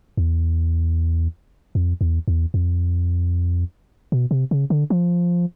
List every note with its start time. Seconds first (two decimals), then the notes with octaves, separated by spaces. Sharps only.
0.17 E2
1.75 F2
2.01 E2
2.28 E2
2.54 F2
4.12 B2
4.31 C3
4.51 C#3
4.70 D3
4.90 F3